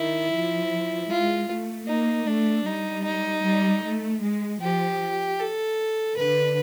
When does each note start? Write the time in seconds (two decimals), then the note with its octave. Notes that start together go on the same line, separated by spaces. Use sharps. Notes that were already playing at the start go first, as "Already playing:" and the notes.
Already playing: D#3 E4
0.32 F3
1.10 G#3 F4
1.49 A3
1.88 A#3 D#4
2.26 A3 D4
2.65 G3 D#4
3.04 D#4
3.43 G3
3.83 A3
4.22 G#3
4.61 F3 G4
5.39 A4
6.17 D3 B4